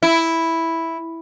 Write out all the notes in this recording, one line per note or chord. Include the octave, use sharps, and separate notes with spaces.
E4